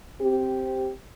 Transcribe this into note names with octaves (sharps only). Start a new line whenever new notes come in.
C4 G4